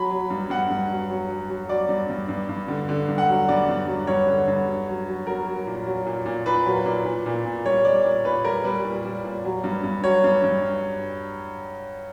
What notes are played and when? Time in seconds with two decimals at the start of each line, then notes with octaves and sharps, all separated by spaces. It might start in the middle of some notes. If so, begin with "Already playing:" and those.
Already playing: F#3 B5
0.11 F#3
0.30 G2
0.50 G2 F#5
0.70 G2
0.90 F#3
1.10 F#3
1.30 F#3
1.50 F#3
1.69 F#3 D5
1.89 G2
2.09 G2
2.29 G2
2.49 G2
2.68 D3
2.89 D3
3.08 G2
3.18 F#5
3.29 F#3
3.48 G2 D5
3.68 G2
3.88 F#3
4.07 G2 C#5
4.28 D3
4.48 G2
4.67 F#3
4.88 F#3
5.08 F#3
5.27 F#3 A#4
5.46 F#3
5.67 A#2
5.86 F#3
6.06 A#2
6.26 A#2
6.46 A#2 B4
6.66 F#3
6.86 A#2
7.05 A#2
7.26 A#2
7.45 A#2
7.65 G3 C#5
7.85 G3 D5
8.05 A#2
8.25 A#2 B4
8.44 G3 A#4
8.64 G3 B4
8.85 A#2
9.04 G3
9.24 A#2
9.44 F#3
9.64 G2
9.84 G2
10.04 F#3 C#5
10.24 G2
10.43 G2